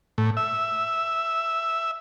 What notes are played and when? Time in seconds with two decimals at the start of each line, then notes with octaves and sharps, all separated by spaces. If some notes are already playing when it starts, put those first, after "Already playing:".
0.18 A2
0.37 E5